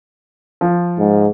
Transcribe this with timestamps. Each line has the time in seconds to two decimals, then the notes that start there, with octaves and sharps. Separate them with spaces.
0.61 F3
0.99 G#2